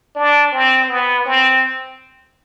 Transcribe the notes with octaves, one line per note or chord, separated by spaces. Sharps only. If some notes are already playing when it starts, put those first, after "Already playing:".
D4
C4
B3
C4